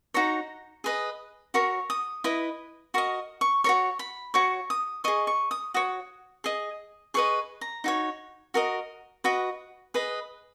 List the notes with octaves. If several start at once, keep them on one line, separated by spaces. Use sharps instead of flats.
D#4 F#4 C#5 A#5
G#4 B4 D#5
F#4 A#4 C#5 C#6
D#6
E4 B4 D#5
F#4 A#4 D#5 C#6
C#6
F#4 A#4 C#5 C#6
B5
F#4 C#5 C#6
D#6
G#4 D#5 C#6
C#6
D#6
F#4 C#5 D#6
G#4 D#5
G#4 B4 D#5 C#6
A#5
D#4 F#4 C#5
F#4 A#4 D#5
F#4 B4 D#5
G#4 B4 D#5